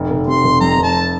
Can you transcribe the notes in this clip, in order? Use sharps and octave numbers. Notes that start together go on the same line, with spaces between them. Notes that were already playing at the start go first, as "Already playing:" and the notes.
Already playing: F1
F1
C3 C6
F1
F2 A#5
F1
A5